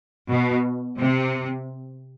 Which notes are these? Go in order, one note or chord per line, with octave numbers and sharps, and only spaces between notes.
B2
C3